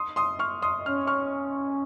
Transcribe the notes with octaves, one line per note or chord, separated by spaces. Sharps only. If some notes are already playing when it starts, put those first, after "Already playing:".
Already playing: C6 D#6
C6 D#6
C#6 F6
C6 D#6
C#4 F6
C#6 F6